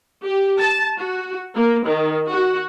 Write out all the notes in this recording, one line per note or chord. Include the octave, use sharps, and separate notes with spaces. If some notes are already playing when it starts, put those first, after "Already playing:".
G4
A5
F#4
A#3
D#3
F#4